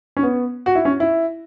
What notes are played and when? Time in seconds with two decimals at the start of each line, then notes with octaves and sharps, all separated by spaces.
0.17 C#4
0.23 B3
0.66 F#4
0.75 E4
0.85 C#4
1.00 E4